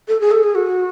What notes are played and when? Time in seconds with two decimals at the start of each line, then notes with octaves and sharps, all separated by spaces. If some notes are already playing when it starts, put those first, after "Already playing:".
0.08 A4
0.21 G#4
0.31 A4
0.43 G#4
0.55 F#4